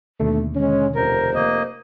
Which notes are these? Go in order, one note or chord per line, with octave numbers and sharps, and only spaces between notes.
D#2 B2 D3 A3
G#3 C#4
F1 A#4 C5
A#3 D#5